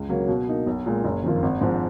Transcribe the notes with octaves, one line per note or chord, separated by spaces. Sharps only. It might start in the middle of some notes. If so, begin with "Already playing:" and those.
Already playing: C#2
C#3 F#3 A#3
B2
A#3 D#4
B1
A#2 G#3
F#1
F2 D#3 A#3 F4
G#1
G#2 F3 G#3